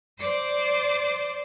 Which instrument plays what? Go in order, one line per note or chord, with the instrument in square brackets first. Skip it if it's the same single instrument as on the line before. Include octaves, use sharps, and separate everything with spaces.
[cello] C5 D5